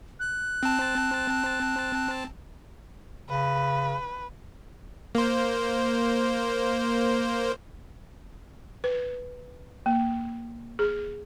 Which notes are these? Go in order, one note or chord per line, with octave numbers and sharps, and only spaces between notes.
F#6
C4 A5
C#3 B4
A#3 C5
B4
A#3
G#4